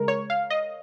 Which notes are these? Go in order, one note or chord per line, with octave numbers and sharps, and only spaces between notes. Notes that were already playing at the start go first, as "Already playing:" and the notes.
Already playing: C#3 G#3 A#4
C#5
F5
D#5